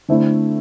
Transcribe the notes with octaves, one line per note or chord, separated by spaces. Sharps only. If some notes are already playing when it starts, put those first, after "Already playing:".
D3 A3 C4 E4